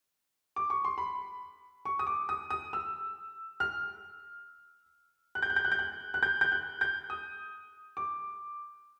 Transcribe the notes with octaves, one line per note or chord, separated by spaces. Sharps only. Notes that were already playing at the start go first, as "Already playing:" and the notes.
D6
C#6
C6
B5
C#6
D#6
D6
D#6
D#6
E6
F6
F#6
G6
F#6
G6
F#6
G6
F#6
F#6
G6
G6
F#6
G6
D#6
D6